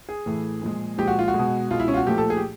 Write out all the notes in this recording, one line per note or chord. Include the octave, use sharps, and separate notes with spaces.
G#4
A2 E3 A3
A#2 F3 G#3
A#2 F3 G#3 G4
F#4
F4
F#4
B2 G#3
B2 G#3 F4
E4
C#4
F4
F#4
A#2 F3 A3 G4
A4
G#4
G4